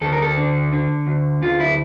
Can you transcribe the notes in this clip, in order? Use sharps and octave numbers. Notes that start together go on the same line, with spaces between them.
D2 A4
A#4
A4
D3
D3
D2
D2 F4
E4